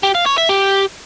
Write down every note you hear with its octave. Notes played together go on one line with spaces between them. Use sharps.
G4
F5
C#5
E5
G4